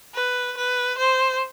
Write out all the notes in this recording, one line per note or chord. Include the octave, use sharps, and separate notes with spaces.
B4
B4
C5